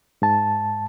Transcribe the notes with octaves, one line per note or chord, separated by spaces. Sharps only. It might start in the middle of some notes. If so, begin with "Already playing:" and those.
G#2 A5